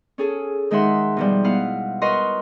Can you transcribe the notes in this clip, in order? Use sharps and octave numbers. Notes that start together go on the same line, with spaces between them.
C#4 G#4 A4
D#3 G#3 D#4 E5 F#5 C6
B2 F3 G3
B3 E4 F5 F#5
F#4 A#4 B4 D#5 C6 C#6